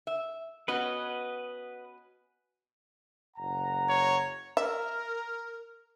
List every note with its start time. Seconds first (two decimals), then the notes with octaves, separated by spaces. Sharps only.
0.07 E5
0.68 B3 C#4 F#4 B4 D#5
3.37 F#1 F#5 A#5
3.89 C#5
4.57 A#4 E5